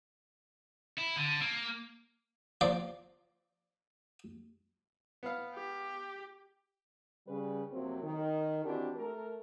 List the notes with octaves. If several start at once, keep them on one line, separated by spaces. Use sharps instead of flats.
E4
D3
A#3
F3 D5
B3 B4 F5
G4
C#3 G3 B4
F2 C3 F#3 A#3 C4
D#3
E3 C4 D4 F#4 G4
A3 A4 A#4